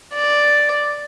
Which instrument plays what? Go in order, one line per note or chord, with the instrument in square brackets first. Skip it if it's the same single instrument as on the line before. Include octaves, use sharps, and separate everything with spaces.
[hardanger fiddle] D5